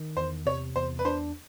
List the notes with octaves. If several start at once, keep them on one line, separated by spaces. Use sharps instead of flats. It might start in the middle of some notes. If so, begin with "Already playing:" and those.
Already playing: D#3
E2 C5
C3 C#5
E2 C5
B4
D4 C5